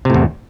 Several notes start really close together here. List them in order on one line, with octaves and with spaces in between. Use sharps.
C3 A2 E2